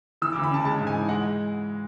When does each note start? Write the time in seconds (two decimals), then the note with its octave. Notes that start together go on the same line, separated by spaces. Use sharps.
0.22 E3 E6
0.33 D6
0.36 D2
0.44 B5
0.50 C#3 A5
0.65 G#3 A5
0.80 G#2
0.87 G#5
0.95 E3
1.09 G#3 F#5